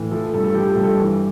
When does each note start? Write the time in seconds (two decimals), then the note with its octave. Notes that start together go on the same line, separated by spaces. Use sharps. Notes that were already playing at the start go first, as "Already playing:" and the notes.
Already playing: A2 E3
0.11 F3 A4
0.34 G2 A4
0.44 A4
0.55 F3 G4
0.70 A4
0.77 G2
0.84 A4
0.99 E3